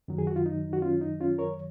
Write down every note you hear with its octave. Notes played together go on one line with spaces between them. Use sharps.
F#2 D#3 F#3
G#4
F#4
F4
D#4
F#4
C#4 F4
D#4
C#4 F4
A#4 C#5